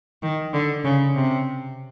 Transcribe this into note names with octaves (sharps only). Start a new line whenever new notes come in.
D#3
D3
C#3
C3